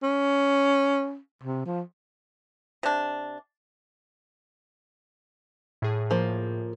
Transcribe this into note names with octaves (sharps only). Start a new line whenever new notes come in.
C#4
C3
F3
C3 D4
A2 G#4
F3 A#3